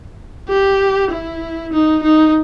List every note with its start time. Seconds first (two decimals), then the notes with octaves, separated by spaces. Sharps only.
0.49 G4
1.11 E4
1.73 D#4
2.03 D#4